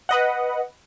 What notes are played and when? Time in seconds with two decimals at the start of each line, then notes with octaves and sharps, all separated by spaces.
0.09 B4 D#5 F#5